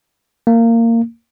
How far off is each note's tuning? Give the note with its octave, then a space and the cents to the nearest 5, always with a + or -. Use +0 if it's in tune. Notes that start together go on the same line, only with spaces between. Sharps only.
A#3 -20